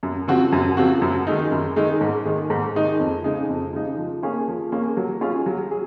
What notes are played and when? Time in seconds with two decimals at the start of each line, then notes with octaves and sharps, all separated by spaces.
0.03 F#2
0.28 C#3 F3 C4 F#4
0.52 F#2
0.77 C#3 F3 C4 F#4
1.02 F#2
1.27 D#3 G#3 D#4
1.51 F#2
1.76 D#3 G#3 D#4
2.01 G#2
2.26 D#3 G#3 D#4
2.50 G#2
2.75 D#3 G#3 D#4
2.99 F2
3.24 C#3 G#3 D#4
3.49 F2
3.73 C#3 G#3 D#4
3.97 F3
4.23 A#3 C#4 G#4
4.48 F3
4.72 A#3 C#4 G#4
4.97 F#3
5.21 C#4 F4 G#4
5.46 F#3
5.71 G#4